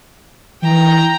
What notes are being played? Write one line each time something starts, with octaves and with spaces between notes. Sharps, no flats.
E3 G5 A#5